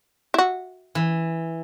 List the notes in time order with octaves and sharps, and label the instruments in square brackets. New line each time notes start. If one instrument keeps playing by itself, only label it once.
[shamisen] E4
F#4
[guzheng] E3